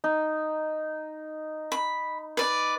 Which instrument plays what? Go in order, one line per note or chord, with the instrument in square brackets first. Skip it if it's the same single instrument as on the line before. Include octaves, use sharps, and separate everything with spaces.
[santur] D#4
[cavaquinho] B5
B4 D5